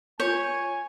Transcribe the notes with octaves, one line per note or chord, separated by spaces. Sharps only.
F4 C#5 G#5 G6